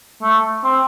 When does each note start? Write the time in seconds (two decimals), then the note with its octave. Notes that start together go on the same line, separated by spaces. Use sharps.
0.23 A3
0.64 C4